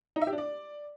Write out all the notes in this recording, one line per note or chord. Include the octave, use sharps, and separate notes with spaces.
D#4
E5
G4
D4
D5